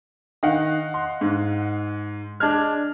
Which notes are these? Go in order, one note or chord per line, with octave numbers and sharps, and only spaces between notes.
D#3 D#5 F5 F#5
C6
G#2
G#3 D4 F6 G#6